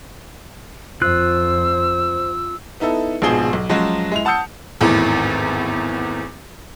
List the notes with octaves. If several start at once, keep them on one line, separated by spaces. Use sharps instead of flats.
F2 F4 C5 E6 F#6
B3 D#4 E4 A4
A#1 G#2 B2 F3 G#4 G7
B1
F3 F#3 G#3 C#4 F#4
G#3 E4 F7
F#5 A5 D#6 E6 G6 C#7
G#1 E2 A2